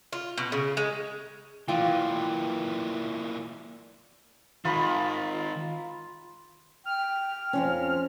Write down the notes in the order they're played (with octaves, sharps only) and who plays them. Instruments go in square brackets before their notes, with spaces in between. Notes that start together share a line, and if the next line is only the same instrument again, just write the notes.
[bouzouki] F4
B2
C#3
G#3
[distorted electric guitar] A#2 E3 [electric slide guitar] E4 G5 [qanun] F4 D5
[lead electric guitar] D#3 G#3 [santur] F4 A#4 B5
[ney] G5 [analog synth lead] F6
[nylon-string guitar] F2 F3 C#4